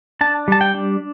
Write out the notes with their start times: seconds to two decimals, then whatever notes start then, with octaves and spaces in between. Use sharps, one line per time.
0.21 D4 A5
0.48 G3 A5
0.61 G5
0.74 D4